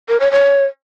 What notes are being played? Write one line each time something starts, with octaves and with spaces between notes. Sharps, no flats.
A#4
C#5
C#5